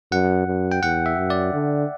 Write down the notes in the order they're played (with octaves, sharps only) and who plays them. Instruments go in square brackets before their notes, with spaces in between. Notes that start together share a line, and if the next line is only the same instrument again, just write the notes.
[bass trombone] F#2 [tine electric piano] F#5
[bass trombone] F#2
[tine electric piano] G5
[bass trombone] E2 [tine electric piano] F#5
[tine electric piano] E5
[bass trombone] F#2
[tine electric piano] D5
[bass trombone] D3